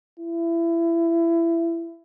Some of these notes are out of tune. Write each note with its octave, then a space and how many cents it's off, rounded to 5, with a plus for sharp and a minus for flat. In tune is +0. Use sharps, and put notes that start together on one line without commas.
E4 +25